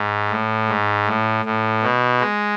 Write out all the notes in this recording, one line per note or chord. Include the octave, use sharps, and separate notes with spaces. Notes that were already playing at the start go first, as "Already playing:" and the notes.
Already playing: G#2
A2
G#2
A2
A2
B2
G#3